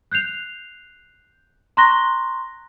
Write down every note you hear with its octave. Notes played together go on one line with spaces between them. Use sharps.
F#6 G6 C7 F7
A#5 C6 C#6 F#6 A#6 G7